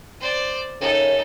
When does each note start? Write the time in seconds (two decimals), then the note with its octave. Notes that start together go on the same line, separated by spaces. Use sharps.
0.20 C5 D5
0.81 F#2 C#3 D#4 A4